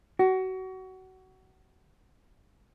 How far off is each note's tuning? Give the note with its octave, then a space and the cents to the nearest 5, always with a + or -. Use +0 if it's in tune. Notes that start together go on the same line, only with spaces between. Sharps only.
F#4 +25